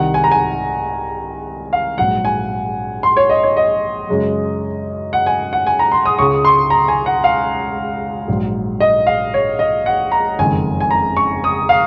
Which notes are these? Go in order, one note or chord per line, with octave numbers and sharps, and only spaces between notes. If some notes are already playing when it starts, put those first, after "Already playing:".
Already playing: C2 C3 D#3 F#5
G#5
A#5
G#5
F5
A#1 G#2 F#3 F#5
G#5
C6
C#5
D#5
C#5
D#5
F#2 C#3 G#3
F#5
G#5
F#5
G#5
A#5
C6
D#6
C#2 C#3 G#3 C#6
C6
A#5
G#5
F#5
F5
A#1 G#2 F#3
D#5
F5
C#5
D#5
F#5
A#5
F#1 F2 D#3 G#3 G#5
G#5
A#5
C#6
D#6
F5